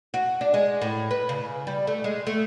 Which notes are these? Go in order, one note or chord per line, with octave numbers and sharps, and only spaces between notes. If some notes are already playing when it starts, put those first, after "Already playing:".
F#4
D4
G#3
A2
B4
C#3
G3
A3
G#3
A3